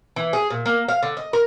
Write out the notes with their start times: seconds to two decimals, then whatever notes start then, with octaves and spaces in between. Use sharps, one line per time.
0.16 E3
0.33 G#4
0.50 A#2
0.66 A#3
0.88 F5
1.03 D3
1.17 D#5
1.33 A#4